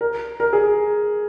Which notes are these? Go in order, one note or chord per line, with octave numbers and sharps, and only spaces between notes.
A#4
A#4
G#4